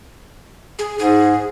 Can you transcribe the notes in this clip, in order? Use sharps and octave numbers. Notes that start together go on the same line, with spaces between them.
G#4
G#2 G#4